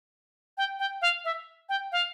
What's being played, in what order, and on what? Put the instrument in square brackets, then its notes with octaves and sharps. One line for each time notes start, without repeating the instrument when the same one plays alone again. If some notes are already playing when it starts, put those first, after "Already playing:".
[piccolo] G5
G5
F5
E5
G5
F5